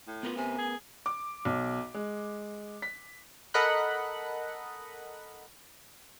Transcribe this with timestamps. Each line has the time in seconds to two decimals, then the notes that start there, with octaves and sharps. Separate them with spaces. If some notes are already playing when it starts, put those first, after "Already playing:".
0.07 A2
0.23 B3 F4 A#4 B4
0.37 C3 G#5
0.58 G#4
1.06 D6
1.45 B1
1.94 G#3
2.82 B6
3.54 A4 A#4 D#5 F#5 B5 F#6